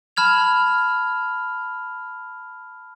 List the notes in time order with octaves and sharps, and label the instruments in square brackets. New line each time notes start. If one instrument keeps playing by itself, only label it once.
[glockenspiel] A5 B5 F6 G#6 F7